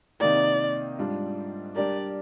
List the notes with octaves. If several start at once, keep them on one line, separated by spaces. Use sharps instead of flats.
C3 D#3 A#3 D#4 D5
G#2 G3 D4 F4
G3 D4 G4 A#4 D5